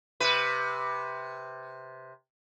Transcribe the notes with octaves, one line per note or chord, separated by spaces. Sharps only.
C3 B4